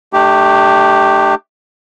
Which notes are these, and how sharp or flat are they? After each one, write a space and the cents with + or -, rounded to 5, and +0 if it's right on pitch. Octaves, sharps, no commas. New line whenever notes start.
A3 -5 D4 +40 G4 +0